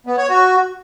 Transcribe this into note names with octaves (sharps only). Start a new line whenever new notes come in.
B3
C#5
F#4